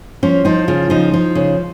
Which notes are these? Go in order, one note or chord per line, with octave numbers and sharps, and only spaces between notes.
F3 C#4
F3 D#4
C#3 F4
F3 D#4
F3
C#3